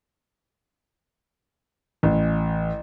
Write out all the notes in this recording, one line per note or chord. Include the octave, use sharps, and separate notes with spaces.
A1